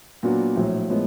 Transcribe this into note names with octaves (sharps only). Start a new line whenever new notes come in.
A#2 F#3 B3 D4 F#4
A#1 A2 F#3
A2 F3 G#3 B3